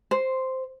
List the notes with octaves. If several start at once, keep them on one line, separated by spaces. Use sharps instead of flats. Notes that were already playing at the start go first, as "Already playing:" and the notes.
C5